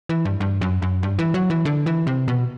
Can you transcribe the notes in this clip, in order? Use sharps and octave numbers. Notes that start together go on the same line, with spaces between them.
E3
G2
G2
F#2
F#2
G2
E3
F#3
E3
D3
E3
C3
B2